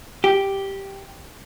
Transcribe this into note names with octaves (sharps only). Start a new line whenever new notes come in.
G4